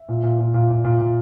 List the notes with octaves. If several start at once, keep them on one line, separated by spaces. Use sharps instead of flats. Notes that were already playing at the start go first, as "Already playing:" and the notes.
Already playing: E5
A#2
A#2
A#2
A#2
A#2
A#2
A#2